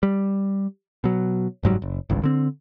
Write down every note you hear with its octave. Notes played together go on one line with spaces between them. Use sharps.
G3
B2 F#3
F#1 G#2 F#3 G3
F#1
G#1 C#2 G2
D3 C4